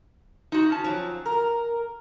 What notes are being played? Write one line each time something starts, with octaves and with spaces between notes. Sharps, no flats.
D#4 F#4
C#4 A5
F3 F#3
A#4